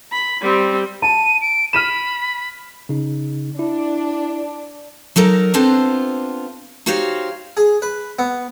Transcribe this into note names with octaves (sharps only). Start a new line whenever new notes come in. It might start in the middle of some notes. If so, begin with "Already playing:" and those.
B5
G3 C4
A5 D#7
D7
B5 F6 D#7 E7
C#3 D#4
D4 E4
F#3 D#4 A4 A#4
B3 C4 D4 F4 A4 C5
D#4 F#4 G4 C5 C#5 F5
G#4
B4
B3